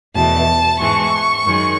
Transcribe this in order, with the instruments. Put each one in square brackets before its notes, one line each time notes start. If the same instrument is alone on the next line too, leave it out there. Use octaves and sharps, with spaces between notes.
[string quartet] E2 B2 A3 A5
G#2 E3 G#3 C#6
F#2 D#3 G#3